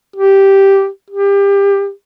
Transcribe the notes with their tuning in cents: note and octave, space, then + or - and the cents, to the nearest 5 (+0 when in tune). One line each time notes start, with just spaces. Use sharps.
G4 -5
G4 +25